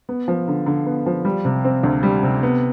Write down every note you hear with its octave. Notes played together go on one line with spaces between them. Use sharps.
B3
F3
D3
D3
B3
F3
G3
C3
C4
D2
G3
C3
B3